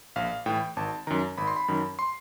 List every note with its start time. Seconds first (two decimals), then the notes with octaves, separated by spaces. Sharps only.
0.16 A#1 F5
0.46 A2 E3 G5
0.77 G#1 A5
1.07 F#2 D#3 A#5
1.38 G#1 B5
1.47 C6
1.56 B5
1.68 F#2 D#3
1.99 C6